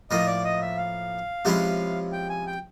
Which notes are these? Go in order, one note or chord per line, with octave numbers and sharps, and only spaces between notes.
A2 F3 A#3 D#5
D5
D#5
E5
F5
C3 F3 G#3 C#4 E4
G5
G#5
G5